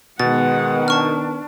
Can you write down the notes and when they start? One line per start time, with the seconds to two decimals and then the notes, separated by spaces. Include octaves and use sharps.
0.20 B2 D#3 G#3 B3 F#5 A6
0.88 D4 A5 C#6 F6